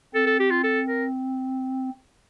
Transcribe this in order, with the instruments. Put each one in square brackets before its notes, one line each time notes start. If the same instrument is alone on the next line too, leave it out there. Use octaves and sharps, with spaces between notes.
[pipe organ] C4 [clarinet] A4
[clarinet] A4
G4
F4
A4
A#4